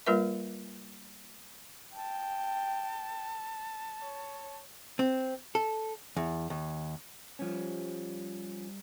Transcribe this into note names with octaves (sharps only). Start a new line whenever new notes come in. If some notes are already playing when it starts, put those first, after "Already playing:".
G3 A#3 F4 A#4 B4 E5
G5 A5
C#5
C4
A4
E2
D#2
F3 G3 C#4